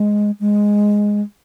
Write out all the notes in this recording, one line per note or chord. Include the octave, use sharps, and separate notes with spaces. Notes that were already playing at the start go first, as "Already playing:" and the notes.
Already playing: G#3
G#3